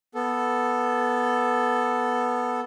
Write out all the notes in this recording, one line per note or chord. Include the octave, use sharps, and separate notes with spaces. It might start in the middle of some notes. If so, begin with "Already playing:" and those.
B3 A4